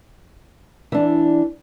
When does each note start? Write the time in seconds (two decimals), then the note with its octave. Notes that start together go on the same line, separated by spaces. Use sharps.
0.92 E3 D4